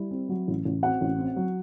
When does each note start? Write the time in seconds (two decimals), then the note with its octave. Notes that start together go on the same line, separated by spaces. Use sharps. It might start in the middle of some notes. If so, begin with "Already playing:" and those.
Already playing: G3 E4
0.11 C4
0.29 F#3
0.48 A1
0.65 A1
0.83 C4 F#4 F#5
1.01 A1
1.18 C4
1.36 F#3